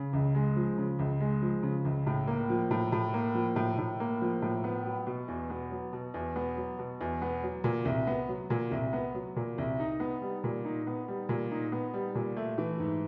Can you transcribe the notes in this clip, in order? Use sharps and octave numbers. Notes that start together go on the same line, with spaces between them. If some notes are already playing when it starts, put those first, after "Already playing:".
Already playing: C#3
C#2
G#3
F3
C#3
C#2
G#3
F3
C#3
C#2
A2
A#3
F3
A2
A2
A#3
F3
A2
A2
A#3
F3
A2
B3
F#3
B2
E2
B3
F#3
B2
E2
B3
F#3
B2
E2
B3
F#3
A#2
C2
B3
F#3
A#2
C2
B3
F#3
A#2
C2
D#4
B3
G3
A#2
D#4
B3
G3
A#2
D#4
B3
G3
A#2
A3
E3
G#2